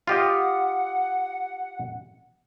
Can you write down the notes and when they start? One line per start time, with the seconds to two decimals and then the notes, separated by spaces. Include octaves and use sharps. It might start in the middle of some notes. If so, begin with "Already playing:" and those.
0.07 F4 G4 D#5 F#5